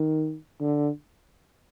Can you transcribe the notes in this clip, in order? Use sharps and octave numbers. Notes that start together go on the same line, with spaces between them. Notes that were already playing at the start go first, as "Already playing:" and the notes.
Already playing: D#3
D3